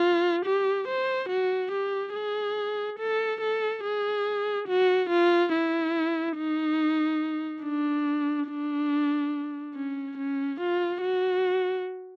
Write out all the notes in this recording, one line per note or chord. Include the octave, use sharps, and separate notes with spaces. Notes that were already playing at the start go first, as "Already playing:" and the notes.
Already playing: F4
G4
C5
F#4
G4
G#4
A4
A4
G#4
F#4
F4
E4
D#4
D4
D4
C#4
C#4
F4
F#4